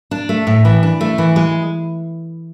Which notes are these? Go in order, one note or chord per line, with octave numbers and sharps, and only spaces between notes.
D4
A3
A2
E3
D4
A3
E3
G#3